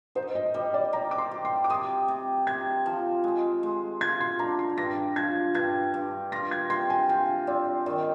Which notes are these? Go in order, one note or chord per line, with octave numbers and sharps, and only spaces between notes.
D#4 C5
D#5
G3 D#5
D5
G3 A#5
D6
C6
G4
C6
D6
C3 D#6
C3
C3 G#6
F3
G#3
G#3
F4 G#6
C6
D4 A#5
C6
G2 A#6
F3 G#6
G2 G#6
G2
F4 A#6
G#6
C3 C6
G#5
F4 G5
C4 D5
D#3 D5